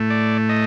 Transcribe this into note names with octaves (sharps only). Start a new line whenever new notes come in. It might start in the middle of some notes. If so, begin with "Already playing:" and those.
Already playing: A2 A3
D5
D#5